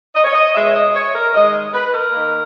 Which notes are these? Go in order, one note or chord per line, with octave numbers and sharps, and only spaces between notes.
D#5
C#5
D#5
B2 G#3 E5
C#5
D#5
C#5
A#4
D#3 G#3 D#5
B4
A#4
D#3 A#3